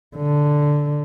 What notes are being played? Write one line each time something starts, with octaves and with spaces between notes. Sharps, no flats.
D3